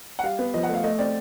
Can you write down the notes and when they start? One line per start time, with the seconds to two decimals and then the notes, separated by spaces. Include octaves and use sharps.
0.19 F#5
0.23 G3 F5
0.39 B3
0.54 F3 D#5
0.63 F#5
0.69 A3
0.74 F5
0.84 A3 D#5
0.98 C4 D5